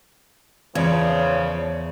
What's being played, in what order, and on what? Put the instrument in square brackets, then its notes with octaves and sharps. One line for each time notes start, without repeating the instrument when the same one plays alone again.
[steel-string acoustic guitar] E2 [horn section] C#3 F3 [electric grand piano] C#5 D5 G#6